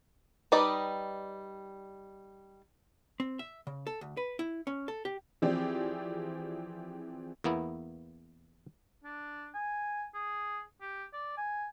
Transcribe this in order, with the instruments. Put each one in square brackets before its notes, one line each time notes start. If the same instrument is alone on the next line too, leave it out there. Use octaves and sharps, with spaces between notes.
[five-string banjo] G3 D#4 B4 D5 D#5
[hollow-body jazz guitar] C4
E5
C#3
A4
D2
B4
E4
C#4
A4
G4
[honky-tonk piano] E3 F3 C4 G4 G#4 D5
[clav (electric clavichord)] E2 A#3 B3 E4
[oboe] D4
G#5
G#4
G4
D5
G#5